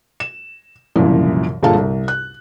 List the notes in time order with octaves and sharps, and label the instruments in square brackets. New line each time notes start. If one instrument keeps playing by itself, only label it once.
[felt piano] E7
C2 F#2 A#2 C#3 E3 F3
G1 A#2 G#4 A4 F5 A5
C2
F#6